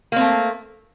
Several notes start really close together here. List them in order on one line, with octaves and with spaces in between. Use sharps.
A#3 C4 A3